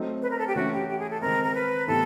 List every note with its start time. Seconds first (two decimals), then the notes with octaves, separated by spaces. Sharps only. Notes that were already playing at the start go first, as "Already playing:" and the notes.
Already playing: F#3 A3 C4 D#4
0.22 B4
0.31 A#4
0.39 A4
0.47 G4
0.56 E3 A3 C#4 E4 F#4
0.73 G4
0.89 G4
0.99 G#4
1.11 A4
1.21 D#3 G#3 C4 A#4
1.44 A#4
1.55 B4
1.87 A2 E3 G3 B3 A4